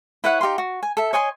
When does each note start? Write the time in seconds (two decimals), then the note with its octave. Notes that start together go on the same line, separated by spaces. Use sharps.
0.24 E4 B4 C#5 F#5
0.41 D#4 G4 F5 C6
0.58 F#4
0.83 G#5
0.97 A4 E5
1.13 C#5 D#5 G#5 C6